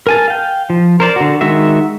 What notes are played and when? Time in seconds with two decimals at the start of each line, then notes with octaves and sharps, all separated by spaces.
0.07 A#4 G#5 A5
0.28 F5 G5
0.70 F3
1.00 A#4 C5 D5
1.16 D3 F#4
1.41 D#3 G#3 F#4 E5